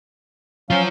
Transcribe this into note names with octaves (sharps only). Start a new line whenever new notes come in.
F#3 C#4 F4 C5 F5